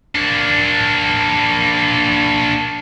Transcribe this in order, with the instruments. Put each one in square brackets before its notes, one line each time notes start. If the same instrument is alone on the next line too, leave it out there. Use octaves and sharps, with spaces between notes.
[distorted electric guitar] A#3 D4